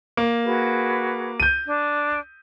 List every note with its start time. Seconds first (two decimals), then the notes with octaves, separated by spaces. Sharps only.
0.17 A#3
0.44 F#4 G#4 B4
1.40 G6 D#7
1.65 D4